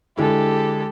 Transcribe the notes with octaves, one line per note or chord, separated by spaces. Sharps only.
D3 G#3 E4 G4 A4